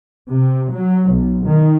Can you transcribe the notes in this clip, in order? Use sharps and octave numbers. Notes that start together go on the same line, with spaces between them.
C3
F#3
B1
D#3